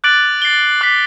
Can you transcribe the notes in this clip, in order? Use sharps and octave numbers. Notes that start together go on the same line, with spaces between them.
D6 F#6 A6 D7 F#7
A6 C7 G7
D6 F#6 B6